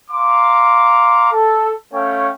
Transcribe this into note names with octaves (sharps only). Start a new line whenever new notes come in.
F5 A#5 C6 D6
A4
A3 C#4 C#5 F5 G5